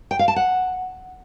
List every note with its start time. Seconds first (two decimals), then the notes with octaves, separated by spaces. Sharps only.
0.11 G5
0.19 F5
0.28 A5
0.36 F#5